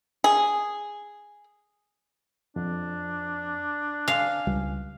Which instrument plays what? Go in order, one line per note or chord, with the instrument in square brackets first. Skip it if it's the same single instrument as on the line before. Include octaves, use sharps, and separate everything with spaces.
[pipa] G#4
[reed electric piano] F2 [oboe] D4
[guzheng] F5 [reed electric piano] G#5
[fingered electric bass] C#2 G3